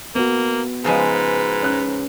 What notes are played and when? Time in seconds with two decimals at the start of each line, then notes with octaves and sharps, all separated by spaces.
0.15 A#3 B3 F#4
0.84 G#2 C#3 F3 G#3 B4
1.62 C#4 F#6